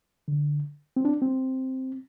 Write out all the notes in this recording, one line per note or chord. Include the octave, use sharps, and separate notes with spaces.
D3
C4
D4
C4